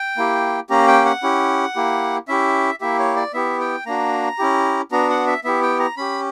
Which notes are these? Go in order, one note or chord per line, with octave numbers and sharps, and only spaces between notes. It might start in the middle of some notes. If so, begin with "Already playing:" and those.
Already playing: G5
A#3 E4 G4
A#3 C#4 G4 A#5
G5
F#5
C#4 E4 G4
A#3 E4 G4
C#4 E4 G4 E5
A#3 E4 G4 E5
C#5
D5
B3 E4 G4 E5
G5
A#3 D4 F#4 A#5
C#4 E4 G4
B3 D4 F#4 A#5
F#5
E5
B3 E4 G4 E5
G5
A#5
C#4 G4 B5